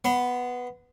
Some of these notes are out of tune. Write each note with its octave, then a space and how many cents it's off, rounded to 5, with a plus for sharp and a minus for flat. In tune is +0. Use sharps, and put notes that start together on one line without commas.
B3 +0 C6 -35